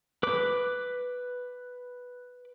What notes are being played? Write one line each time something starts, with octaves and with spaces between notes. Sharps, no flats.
B4 D6